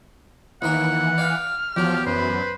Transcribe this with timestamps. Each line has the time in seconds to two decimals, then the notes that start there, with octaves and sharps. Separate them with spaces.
0.62 D#2 E3 A#3 A#4 F#5
1.18 D5 F5 G5 F6
1.77 E2 F3 F#3 G4
2.06 F#2 B4 C5